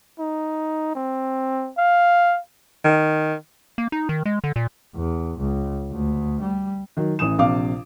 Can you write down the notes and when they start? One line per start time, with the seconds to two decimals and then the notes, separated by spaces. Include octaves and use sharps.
0.19 D#4
0.95 C4
1.78 F5
2.84 D#3
3.78 A#3
3.92 D#4
4.09 D#3
4.26 G#3
4.44 D3
4.56 A#2
4.96 E2
5.39 C#2
5.92 D2
6.41 G3
6.97 D#3 F#3
7.19 A1 E3 D#6 E7
7.38 A#1 C3 F5 D6